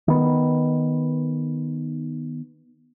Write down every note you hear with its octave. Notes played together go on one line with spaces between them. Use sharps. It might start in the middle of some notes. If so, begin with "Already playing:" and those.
D#3 B3